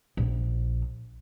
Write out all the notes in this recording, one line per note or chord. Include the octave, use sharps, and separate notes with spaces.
A#1